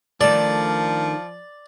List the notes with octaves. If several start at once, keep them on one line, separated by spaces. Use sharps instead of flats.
D#3 F3 A3 D4 D5